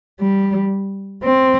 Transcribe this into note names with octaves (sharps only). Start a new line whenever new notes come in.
G3
C4